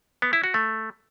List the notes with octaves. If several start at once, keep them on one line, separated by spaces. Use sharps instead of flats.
B3
E4
F#4
A3